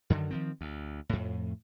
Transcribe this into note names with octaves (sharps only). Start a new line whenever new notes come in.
F#2 D3 D#3
D#3 F3 C4
D2
F2 A2